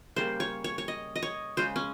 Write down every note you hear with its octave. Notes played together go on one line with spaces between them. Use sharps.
C#3 G3 A#3 C5
C#5
C#5
C#5
D#5
D#5
C#5
C#3 G#3 C5
C#4